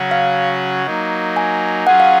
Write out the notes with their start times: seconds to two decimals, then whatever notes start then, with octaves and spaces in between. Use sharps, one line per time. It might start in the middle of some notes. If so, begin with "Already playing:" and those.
Already playing: C#3 F#3 C#4 F#4
0.11 F5
0.86 F#3 A#3 D#4
1.37 G#5
1.87 F#3 C#4 F4 G#4 F#5
2.00 F5